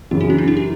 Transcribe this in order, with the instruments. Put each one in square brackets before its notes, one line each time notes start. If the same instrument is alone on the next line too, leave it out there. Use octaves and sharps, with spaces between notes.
[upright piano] F#2 C#3 E3 [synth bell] E4
[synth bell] F#4
C#4
D4
E4
G4